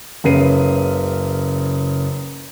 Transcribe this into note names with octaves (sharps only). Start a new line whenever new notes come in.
F#1 C#3 B4 C7 D#7